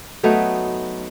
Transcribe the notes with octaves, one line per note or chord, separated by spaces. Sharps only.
F#3 A3 B3 D#4